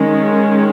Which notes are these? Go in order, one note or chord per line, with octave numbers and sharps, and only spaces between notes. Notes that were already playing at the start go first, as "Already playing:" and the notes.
Already playing: D#3 G#3 C#4